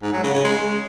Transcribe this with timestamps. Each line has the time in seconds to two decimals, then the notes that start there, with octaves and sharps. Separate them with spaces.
0.03 G#2
0.13 F#3
0.23 C#3
0.34 C#3
0.44 G#3